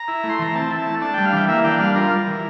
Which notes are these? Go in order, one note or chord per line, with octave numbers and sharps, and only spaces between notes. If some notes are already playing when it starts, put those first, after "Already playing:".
Already playing: A#5
E4
A3
C6
E3 A#5
C4 A5
E4
A5
A3
D4 A5
G3 G5
F5
E3 G5
A#3 E5
D4 G5
G3 F5
F4 A#4
G3
E3